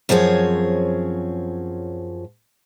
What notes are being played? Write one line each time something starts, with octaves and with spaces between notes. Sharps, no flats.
F#2 F3 C4 G#4 C#5